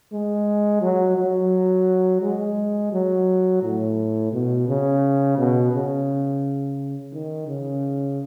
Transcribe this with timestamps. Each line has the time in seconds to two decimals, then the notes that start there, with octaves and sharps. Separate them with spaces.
0.13 G#3
0.82 F#3
1.17 F#3
2.22 G#3
2.93 F#3
3.63 A2
4.32 B2
4.68 C#3
5.38 B2
5.73 C#3
7.13 D#3
7.47 C#3